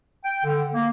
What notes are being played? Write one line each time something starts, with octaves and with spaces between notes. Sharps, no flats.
G5
D3
A#3